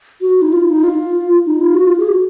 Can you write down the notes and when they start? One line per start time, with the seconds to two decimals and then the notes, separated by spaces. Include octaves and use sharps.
0.21 F#4
0.42 D#4
0.52 F4
0.69 D#4
0.84 F4
1.46 D#4
1.61 F4
1.74 F#4
1.87 F4
1.99 G#4
2.08 F#4